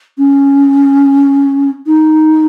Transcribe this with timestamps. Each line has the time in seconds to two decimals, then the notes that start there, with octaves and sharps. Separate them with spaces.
0.18 C#4
1.87 D#4